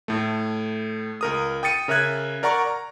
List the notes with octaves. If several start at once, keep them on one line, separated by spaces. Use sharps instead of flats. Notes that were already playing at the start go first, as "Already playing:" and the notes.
A2 A3
C#2 A#4 D#6
G5 D#6 A6 C#7 D#7
C#3 A#4 E5 F#6 G#6
A#4 D5 F#5 A#5 C#6
A#5